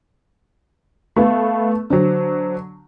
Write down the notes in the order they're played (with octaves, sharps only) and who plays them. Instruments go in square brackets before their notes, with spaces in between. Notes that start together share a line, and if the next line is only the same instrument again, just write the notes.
[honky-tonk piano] A3 B3 [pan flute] F5
[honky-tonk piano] D3 F#3 [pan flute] C5